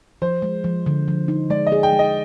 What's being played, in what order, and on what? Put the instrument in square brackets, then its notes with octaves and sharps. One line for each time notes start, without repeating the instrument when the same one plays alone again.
[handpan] F3 [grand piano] C5
[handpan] G#3
F3
D3
F3
D#4
[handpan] G#3 [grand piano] D5
[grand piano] D#5
[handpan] G#4
[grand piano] G5
[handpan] G#3
[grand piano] D#5